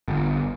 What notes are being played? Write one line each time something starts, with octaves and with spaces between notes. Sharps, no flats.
G1